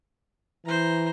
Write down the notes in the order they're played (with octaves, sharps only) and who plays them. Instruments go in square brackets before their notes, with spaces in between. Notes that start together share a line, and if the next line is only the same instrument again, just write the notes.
[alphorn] E3 [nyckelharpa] C5 A#5